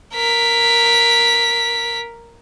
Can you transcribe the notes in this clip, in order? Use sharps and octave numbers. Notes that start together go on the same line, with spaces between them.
A#4 B6